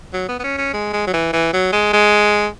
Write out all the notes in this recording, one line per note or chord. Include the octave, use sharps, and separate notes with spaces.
F#3
B3
B3
C#4
C#4
G#3
G#3
F#3
E3
E3
F#3
G#3
G#3